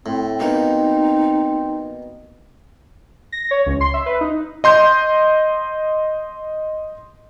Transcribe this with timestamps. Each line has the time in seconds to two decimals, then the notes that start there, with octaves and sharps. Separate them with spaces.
0.06 A2 C4
0.40 B2 A#3 D#4
3.32 A#6
3.51 C#5
3.66 C#2
3.81 C6
3.94 E5
4.06 B4
4.21 D#4
4.64 D#5 C6 G6